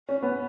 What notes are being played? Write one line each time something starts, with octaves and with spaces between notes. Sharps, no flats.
C#4
B3